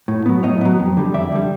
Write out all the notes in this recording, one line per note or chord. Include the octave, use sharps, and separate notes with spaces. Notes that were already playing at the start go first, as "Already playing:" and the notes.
A2
F#3 B3
A2 C#5 D#5
F#3 B3
F2
D3 G3
F2 D5 E5
D3 G3